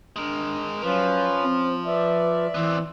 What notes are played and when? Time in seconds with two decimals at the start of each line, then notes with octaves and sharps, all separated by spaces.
0.16 G#3 D4 A#4
0.84 F3 F#3 C#4 F4 B4
1.42 C4
1.86 B4 D5 E5
2.54 E3 B3 C4